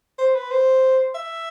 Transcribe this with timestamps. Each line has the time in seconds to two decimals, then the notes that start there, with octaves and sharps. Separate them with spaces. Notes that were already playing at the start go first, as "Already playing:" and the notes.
0.19 C5
0.35 B4
0.51 C5
1.15 E5